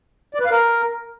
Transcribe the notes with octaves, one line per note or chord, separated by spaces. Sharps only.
D5
B4
F5
A#4